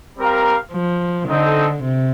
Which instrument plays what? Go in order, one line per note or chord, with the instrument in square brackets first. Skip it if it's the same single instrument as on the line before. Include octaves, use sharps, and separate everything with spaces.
[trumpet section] G3 C4 G4 A#4 F5
[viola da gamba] F3
[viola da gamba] D3 [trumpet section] C4 D#4 A4 D#5
[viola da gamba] C3